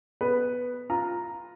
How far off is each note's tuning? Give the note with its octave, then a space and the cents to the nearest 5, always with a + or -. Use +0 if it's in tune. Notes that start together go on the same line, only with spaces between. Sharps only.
B3 +0 B4 +0
F4 +5 A#5 +0